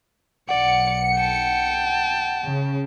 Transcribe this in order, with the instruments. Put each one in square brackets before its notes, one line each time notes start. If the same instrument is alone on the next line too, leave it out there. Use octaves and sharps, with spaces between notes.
[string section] B1 C#7 [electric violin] D5 [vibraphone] F#5
[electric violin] G5 A5
[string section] C#3